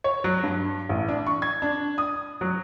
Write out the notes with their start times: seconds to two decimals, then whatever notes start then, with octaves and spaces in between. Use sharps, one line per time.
0.04 C#5
0.24 F#3
0.43 G2
0.89 A1
1.08 D4
1.27 C#6
1.42 G#6
1.62 D4
1.98 D#6
2.41 F#3